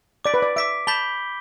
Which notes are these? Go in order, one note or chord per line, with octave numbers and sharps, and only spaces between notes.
D5 D6 B6 D7
B4
D5
E5 D6 B6 D7
A5 B5 G6 B6 G7